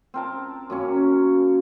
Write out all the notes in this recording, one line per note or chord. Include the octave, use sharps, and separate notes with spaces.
C4 A#4 A5
F#2 A#3 C#4